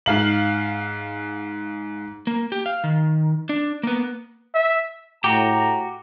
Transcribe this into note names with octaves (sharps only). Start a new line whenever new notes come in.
G#2 F5 F#7
A#3
G4
F5
D#3
D4
A#3 B3
E5
A2 F#4 G4 A#5